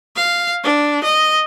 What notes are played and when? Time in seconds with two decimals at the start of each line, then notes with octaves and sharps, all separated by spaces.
0.16 F5
0.64 D4
1.03 D#5